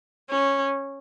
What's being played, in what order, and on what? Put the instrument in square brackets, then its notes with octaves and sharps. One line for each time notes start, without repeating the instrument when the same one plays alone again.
[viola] C#4